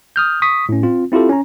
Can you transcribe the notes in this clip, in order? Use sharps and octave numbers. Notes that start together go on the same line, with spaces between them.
D#6 F6 G6
C#6 D#6 B6
A2 C#4
C4 F4
C4 E4 F4 G4 A4
C#4 A#5